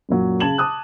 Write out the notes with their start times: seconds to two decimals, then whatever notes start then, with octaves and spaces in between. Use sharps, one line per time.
0.09 F#2 A#2 F#3
0.40 C#3 A5 G#6 E7 F#7
0.58 A5 D6 D#6 F#6